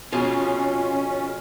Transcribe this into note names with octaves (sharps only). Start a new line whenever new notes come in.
F2 B2 C#4 F4 G#4 G#5